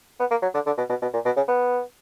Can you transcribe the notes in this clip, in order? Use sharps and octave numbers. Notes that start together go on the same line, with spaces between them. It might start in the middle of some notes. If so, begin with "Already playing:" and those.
B3
A#3
F#3
D3
D3
B2
B2
B2
A#2
B2
C#3
B3